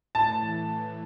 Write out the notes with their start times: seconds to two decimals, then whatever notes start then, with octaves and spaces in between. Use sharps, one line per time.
0.15 A2 A5
0.43 E3
0.69 E3